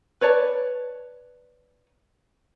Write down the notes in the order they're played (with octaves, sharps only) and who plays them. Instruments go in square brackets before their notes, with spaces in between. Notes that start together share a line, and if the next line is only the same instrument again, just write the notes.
[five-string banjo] B4 C#5 D5 A5